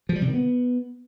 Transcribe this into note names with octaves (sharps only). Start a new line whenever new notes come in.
F3
G3
C3
D#3
B3